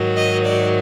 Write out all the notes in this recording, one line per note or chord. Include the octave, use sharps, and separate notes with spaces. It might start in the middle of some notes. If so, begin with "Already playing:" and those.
Already playing: G#2 D#3 F#3
D#5
D5